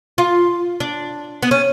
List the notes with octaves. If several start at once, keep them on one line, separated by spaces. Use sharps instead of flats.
F4
D4
B3
C#4